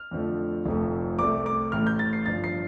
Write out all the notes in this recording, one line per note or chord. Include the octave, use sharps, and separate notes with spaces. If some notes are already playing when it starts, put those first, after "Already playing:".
Already playing: F6
F2 D3 F3 A3
F1 F2 F3 A3
C2 C3 A3 D6
D6
A1 A2 A3 F6
G6
A6
C7
G1 G2 F3 A6
C7